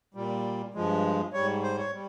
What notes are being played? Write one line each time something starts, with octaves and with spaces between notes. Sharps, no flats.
A#2 G3
G2 F3 G#3
G#2 G3 C#5
C5
C#5
G3